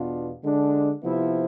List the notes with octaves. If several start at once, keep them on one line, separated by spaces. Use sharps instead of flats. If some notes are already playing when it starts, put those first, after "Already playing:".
Already playing: E2 B2 B3 D4 F4
D3 G#3 D4
C3 F3 B3 E4